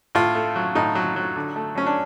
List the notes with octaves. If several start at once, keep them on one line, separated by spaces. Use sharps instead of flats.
A2 F4
A3
F#3
A2 D#4
F#3
F#3
D3
A3
F#3 C#4
D4